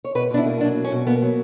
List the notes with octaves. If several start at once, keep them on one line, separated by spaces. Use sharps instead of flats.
C#5
B2 B4
B2 D4
E4
A#3
F#3 D4
B2
C#4
B2
A#3 B3
F#3